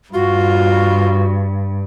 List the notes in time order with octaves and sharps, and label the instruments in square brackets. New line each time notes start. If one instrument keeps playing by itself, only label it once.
[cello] G2 [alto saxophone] F4 [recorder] F#4